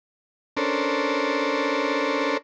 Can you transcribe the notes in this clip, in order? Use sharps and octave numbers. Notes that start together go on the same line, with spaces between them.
C#4 D4 A4 A#4 C5